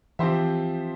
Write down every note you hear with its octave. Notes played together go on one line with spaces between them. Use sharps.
E3 F3 C4 G4 C5 E5